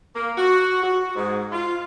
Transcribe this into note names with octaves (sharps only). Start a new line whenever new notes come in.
A#3
F#4
F#4
G#2
F4